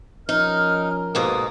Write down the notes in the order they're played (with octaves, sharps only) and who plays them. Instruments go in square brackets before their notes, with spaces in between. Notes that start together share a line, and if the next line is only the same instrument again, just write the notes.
[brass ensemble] F3 C#4 A#4 [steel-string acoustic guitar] D#4 [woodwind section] D#5 F6
[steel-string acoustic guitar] G#2 B2 A#3 [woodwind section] A4 F5 D#6